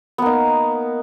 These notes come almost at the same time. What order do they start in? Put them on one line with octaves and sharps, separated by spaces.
B3 A#3 D#4